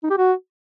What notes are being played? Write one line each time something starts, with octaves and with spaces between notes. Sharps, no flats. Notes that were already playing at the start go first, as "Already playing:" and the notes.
D#4
G4
F#4